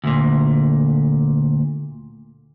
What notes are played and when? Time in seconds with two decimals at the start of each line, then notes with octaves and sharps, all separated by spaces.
0.04 D2 A#2